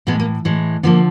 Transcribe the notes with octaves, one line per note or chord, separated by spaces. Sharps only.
A2 E3 G#3 B3
A#3
A2 E3 G#3
D3 F3 A#3 B3